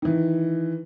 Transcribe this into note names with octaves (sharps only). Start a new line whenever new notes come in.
D#3 E3